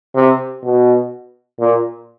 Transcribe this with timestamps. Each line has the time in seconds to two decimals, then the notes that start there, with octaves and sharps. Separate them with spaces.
0.15 C3
0.63 B2
1.60 A#2